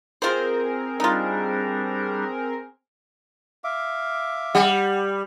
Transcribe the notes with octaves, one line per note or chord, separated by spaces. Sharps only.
C4 F4 G#4 A#4 C5
G3 D4 D#4 F4
E5 F5 D6
G3 F#5